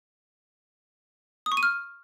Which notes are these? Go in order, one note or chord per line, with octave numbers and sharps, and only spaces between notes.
D#6
C#6
D#7
F6